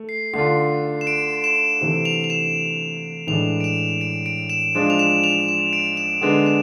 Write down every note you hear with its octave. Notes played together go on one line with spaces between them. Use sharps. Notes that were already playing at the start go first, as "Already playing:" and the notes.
Already playing: A3
C7
D3 A3 D4 F4 C7
E7
D7
E7
C3 E3 A3
F7
F7
E7
A2 E3 G#3 D4 F7
D7
E7
D7
D7
E7
F3 G#3 D4 F4
F7
E7
F7
E7
D7
E7
D3 G#3 B3 D4
E7